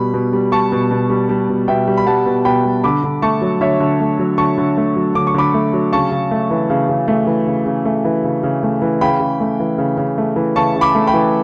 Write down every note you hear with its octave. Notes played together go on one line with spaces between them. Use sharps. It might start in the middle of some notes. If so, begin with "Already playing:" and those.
Already playing: B2 G3 B5
B2
G3
G3 A5 C#6
B2
B2
G3
G3
B2
B2 E5 G5
G3
B5
G3 F#5 A5
B2
B2 G5 B5
G3
D3 B5 D6
D3
A3 A5 C#6
F#3
D3 C#5 E5
D3
A3
F#3
D3 A5 C#6
D3
A3
F#3
D3 D6
C#6
D3 B5 D6
A3
F#3
C#3 A5 C#6
C#3
A3
E3
C#3
C#3
A3
E3
C#3
C#3
A3
E3
C#3
C#3
A3
E3
C#3 G5 B5
C#3
A3
E3
C#3
C#3
A3
E3
C#3 A5 C#6
C#3
B5 D6
A3
G5 B5
E3